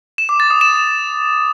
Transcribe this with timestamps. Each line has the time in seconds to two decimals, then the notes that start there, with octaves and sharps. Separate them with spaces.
0.18 E7
0.29 D6
0.40 A6
0.50 D#6
0.61 E7